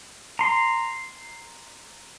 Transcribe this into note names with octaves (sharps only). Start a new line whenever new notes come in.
A#5 C6